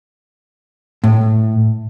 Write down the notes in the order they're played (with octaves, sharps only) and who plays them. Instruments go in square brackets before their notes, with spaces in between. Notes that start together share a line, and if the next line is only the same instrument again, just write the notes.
[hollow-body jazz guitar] A2